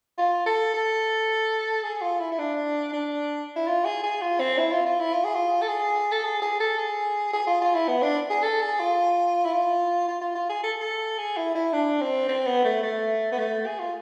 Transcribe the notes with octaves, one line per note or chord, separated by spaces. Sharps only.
F4
A4
A4
G#4
F4
E4
E4
D4
D4
E4
F4
G#4
G#4
F4
C4
E4
F4
F4
E4
F4
G#4
F4
A4
G#4
A4
G#4
G#4
A4
G#4
G#4
F4
F4
E4
B3
D4
G#4
A4
G#4
F4
E4
F4
F4
F4
F4
G#4
A4
A4
G#4
E4
E4
D4
C4
C4
B3
A3
A3
B3
A3
G#4
F4